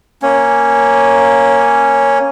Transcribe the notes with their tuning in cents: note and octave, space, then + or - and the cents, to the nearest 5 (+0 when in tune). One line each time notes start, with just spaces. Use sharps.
A#3 +0 C#4 +0